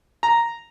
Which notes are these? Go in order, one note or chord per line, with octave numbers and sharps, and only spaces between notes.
A#5